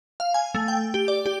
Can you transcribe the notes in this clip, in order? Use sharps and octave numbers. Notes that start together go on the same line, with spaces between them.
F5
G#5
A3
G5
G4
D5
G4